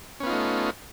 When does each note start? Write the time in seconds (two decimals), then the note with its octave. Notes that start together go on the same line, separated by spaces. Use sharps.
0.20 C#4
0.23 B3
0.26 F4
0.30 D#4
0.33 A3